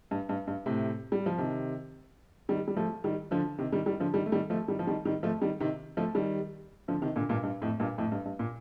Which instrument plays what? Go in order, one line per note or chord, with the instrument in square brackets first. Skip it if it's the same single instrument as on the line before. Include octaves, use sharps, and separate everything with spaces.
[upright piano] G2
G2
G2
A2 C3
G3
F3
C3 D#3
D#3 G3
G3
F3 A3
D#3 G3
D3 F3
C3 D#3
D#3 G3
D#3 G3
D3 F3
D#3 G3
A3
D#3 G3
F3 A3
D#3 G3
F3
D#3 G3
D#3 G3
F3 A3
D#3 G3
C3 D#3
F3 A3
D#3 G3
D3 F3
C3 D#3
A#2 D3
G2 A#2
G2
F2 A2
G2 A#2
F2 A2
G2
G2
A#2